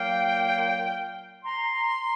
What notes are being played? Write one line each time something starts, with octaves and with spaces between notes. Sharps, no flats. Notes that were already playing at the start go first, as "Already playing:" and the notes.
Already playing: A#2 F#3 A#3 F5 G5
A#5 C6